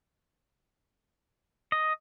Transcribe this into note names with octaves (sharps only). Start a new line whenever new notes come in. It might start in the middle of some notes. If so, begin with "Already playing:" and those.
D#5